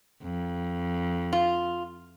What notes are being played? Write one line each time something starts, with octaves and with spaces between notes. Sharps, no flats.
F2
F4